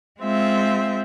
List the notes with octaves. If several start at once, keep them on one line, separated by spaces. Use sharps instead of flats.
G#3 C4 F4 E5